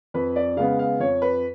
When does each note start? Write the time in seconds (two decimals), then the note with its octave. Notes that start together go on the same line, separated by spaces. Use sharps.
0.14 F2 B4
0.36 D5
0.57 C#3 G#3 B3 F5
0.79 F5
0.99 F2 C#5
1.22 B4